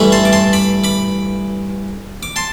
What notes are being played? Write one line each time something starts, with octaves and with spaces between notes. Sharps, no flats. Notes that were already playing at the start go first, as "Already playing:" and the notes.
Already playing: G2 E3 A3 E4
A5 C6
D6
A5 C6
B5 D6
B5 D6
D6
A5 C6